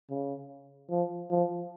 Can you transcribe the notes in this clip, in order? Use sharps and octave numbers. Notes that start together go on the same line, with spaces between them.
C#3
F3
F3